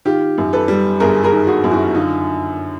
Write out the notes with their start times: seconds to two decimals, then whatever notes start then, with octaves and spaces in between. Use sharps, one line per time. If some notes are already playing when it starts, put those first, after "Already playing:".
0.05 D#3 F4 G4
0.38 F#2
0.53 A4 B4
0.68 G3
1.00 G1 G#4 A#4
1.23 G#4 A#4
1.32 D#3
1.47 F#4 G#4
1.64 F#2
1.71 E4 F#4
1.95 D3 D#4 F4